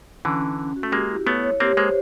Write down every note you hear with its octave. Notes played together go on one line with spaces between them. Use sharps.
D3 E3 C#4
C#4
C#4
F#4
A3
G#3 A#3 G4
E4
A3 B3 C#5
C#5
A#3 C4 G4
G#3 A#3 C5